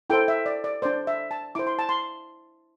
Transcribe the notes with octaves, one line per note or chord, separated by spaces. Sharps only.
E4 A4 C5 G5
E5
D5
D5
D4 C5 D5
E5
A5
E4 C5 D6
C6
A5
C6